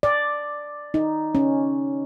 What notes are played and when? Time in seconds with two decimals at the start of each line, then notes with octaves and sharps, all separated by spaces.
0.03 D5
0.94 D#4
1.35 C#4